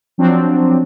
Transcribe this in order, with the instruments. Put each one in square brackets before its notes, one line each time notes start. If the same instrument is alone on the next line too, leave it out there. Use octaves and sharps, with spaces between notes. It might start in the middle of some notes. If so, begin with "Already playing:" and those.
[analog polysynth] F3 F#3 C4 D4